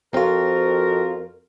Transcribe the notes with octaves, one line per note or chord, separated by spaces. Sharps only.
F2 C4 F4 F#4 A#4